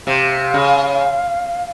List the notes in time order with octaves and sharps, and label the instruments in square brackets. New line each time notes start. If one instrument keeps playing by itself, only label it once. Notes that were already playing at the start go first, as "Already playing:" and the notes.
[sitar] C3 [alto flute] F5
[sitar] C#3